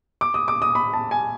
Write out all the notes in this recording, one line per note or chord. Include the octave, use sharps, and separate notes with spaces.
D6
D#6
D6
D#6
B5
A5
G#5